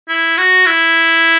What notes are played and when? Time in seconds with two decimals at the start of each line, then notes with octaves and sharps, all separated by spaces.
0.09 E4
0.37 F#4
0.66 E4